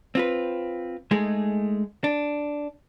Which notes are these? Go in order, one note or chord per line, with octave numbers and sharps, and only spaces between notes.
C4 F4 B4
G#3 A3 D#4 G#4
D4